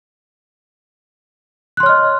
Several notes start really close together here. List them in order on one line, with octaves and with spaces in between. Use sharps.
F#6 C6 C#5 F6 D#5